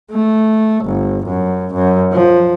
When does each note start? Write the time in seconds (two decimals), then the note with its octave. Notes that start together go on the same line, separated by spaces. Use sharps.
0.12 A3
0.85 G1
1.27 F#2
1.74 F#2
2.13 F3